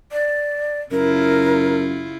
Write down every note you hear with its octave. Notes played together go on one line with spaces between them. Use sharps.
D5
F#2 C#3 E4 F4 A#4